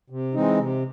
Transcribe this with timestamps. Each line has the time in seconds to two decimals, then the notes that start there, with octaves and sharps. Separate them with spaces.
0.10 C3
0.34 E3 G#3 C4 D#4
0.59 C3